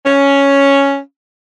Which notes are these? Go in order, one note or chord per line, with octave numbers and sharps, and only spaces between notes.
C#4